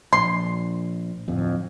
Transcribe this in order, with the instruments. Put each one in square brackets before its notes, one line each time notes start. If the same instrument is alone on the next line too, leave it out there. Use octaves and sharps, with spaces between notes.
[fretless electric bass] A#1 [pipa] C6
[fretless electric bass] D1 F2